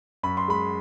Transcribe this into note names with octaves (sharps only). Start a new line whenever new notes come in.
F#2 B5
C6
G#3 B5